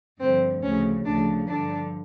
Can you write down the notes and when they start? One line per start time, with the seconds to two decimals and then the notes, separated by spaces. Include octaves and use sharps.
0.19 G2 D3 F3 C4
0.62 D2 C#3 F3 C#4
1.05 D2 C#3 F3 D4
1.47 G2 D3 F3 D4